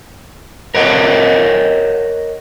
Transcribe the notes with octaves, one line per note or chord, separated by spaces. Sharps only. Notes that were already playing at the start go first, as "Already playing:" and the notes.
A#4 C#5 D#5 F#5